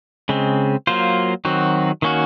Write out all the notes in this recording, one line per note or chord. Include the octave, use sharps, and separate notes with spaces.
C#3 G#3 C4
F#3 A#3 F4 C5
D#3 F#3 C4 F#4
D#3 A#3 C#4 F#4